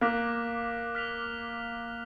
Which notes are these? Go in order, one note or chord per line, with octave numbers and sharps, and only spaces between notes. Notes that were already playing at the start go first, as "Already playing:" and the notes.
A#3 D6 F#6 B6
F6 B6 F7